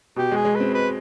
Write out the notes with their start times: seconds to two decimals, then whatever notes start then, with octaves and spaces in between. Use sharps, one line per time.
0.16 B2 G4
0.31 G#3 G#4
0.45 G#3
0.55 C4 B4
0.74 B4